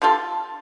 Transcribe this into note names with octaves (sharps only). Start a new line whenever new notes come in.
D3 G3 F4 A4